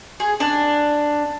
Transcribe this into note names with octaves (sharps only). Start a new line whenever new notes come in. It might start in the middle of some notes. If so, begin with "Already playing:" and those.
G#4
D4